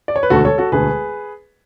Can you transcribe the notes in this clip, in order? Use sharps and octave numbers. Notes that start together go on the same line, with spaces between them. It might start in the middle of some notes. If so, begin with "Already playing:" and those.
D5
C#5
B4
E1 D2 D3 A3 F#4 A4
A4 C#5
F#4 A4
E1 D2 D3 A3 G#4 B4